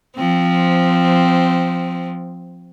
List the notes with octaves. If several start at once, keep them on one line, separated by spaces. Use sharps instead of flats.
F3 C4